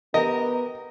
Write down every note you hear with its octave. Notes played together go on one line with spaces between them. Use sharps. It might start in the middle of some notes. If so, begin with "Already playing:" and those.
B3 G4 A#4 D#5